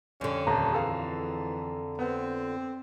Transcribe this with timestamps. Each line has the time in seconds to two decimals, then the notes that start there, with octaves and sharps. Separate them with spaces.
0.21 F2 D3 G3 C#4
0.47 D#1 A5 A#5
0.72 E3 G#4 A4 F5
1.99 B3 C4